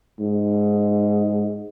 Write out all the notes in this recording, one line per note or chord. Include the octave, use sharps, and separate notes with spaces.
G#2